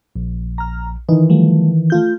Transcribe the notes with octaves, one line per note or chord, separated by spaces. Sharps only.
A#1
A#5 F6
D#3 E3 D#4
F3 G3 A3
A3 F4 G6